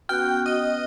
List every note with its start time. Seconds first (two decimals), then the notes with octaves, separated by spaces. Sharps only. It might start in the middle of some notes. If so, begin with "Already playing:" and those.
0.09 B3 C#4 F#4 B4 G5 F6 F#6
0.46 D#5